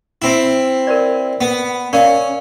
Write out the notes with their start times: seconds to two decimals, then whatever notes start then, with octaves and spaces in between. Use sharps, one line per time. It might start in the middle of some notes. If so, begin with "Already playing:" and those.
0.22 C4 E4
0.87 A#4 B4 D5
1.41 B3
1.93 C#4 A#4 D5 F5